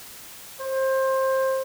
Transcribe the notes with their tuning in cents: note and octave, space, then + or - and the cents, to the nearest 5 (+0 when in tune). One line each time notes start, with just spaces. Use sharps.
C5 +20